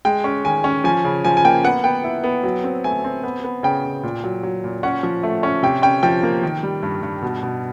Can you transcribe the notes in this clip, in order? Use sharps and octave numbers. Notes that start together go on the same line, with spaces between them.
G#3 G5
C#4
D#3 G#5
C#4
F3 G#5
C#3
F3 G#5
G#5
A#3 G5
B3 F#5
B3 G5
E4
B3
F#3
C4
A3 G#5
C4
B3
B3
C#3 G5
C#3
A#2
F#3
F#3
A#2
C#4 F#5
F3
A3
C#4
C3 G5
C#4 G5
F3 G5
A#3
D#3
G3
G2
G2
B2
B2